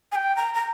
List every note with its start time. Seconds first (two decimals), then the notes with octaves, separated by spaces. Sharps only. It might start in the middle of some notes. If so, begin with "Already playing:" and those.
0.12 G#5
0.16 G5
0.37 A#5
0.54 A#5